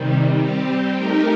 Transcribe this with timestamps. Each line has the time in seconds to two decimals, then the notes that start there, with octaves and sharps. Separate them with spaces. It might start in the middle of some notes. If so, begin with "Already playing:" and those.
Already playing: C3 D#3 G3
0.35 G3 C4 G4
0.96 A3 D#4 G4 A#4